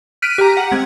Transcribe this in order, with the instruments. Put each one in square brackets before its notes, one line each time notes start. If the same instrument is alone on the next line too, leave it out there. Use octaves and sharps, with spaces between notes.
[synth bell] F6 F#6 B6 D7 D#7
G4 A#5
F#5
G#3 C4 G#6